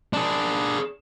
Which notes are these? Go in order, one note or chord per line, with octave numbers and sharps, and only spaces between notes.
D4 G#4